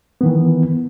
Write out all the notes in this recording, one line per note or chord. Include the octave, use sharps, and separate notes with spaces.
D#3 E3 B3